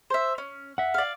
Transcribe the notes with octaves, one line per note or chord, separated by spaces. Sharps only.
C5 E5
C#4
E5 F#5
D5 F5